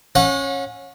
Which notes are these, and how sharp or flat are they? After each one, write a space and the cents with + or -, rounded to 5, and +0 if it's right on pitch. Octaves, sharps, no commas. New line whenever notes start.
C#4 -15 F#5 -40